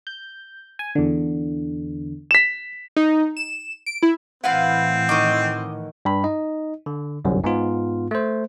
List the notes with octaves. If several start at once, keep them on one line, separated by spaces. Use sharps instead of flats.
G6
G#5
E2 D3
B6 E7
D#4
E7
D7
E4
A2 E3 C4 E4 B4 F5 F#5
D#3 D#5 C#6 D6
G2 B5
D#4 D#5
D3
G1 C2 F#2 F#3
G#2 B3 F4
A3 C5